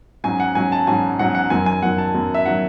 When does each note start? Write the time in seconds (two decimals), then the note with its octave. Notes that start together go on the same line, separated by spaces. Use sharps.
0.24 G#2 F#3 C#4 G#5
0.40 F#5
0.55 G#2 F#3 C#4 G#5
0.72 A5
0.87 G#2 F#3 C#4 G#5
1.19 G#2 F#3 C#4 F#5
1.35 F#5
1.50 F#2 D#3 F#3 G#5
1.66 G#5
1.82 F#2 D#3 F#3 F#5
1.98 A5
2.14 F#2 D#3 F#3
2.34 E5
2.46 D#3 F#3 F#5